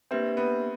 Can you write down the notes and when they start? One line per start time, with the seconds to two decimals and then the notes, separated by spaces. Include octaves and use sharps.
0.11 A#3 C4 D4 G4 B4 E5
0.37 B3